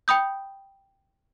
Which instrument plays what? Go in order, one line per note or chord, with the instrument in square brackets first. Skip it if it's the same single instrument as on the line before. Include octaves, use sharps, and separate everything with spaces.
[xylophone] G5 B5 D#6 G6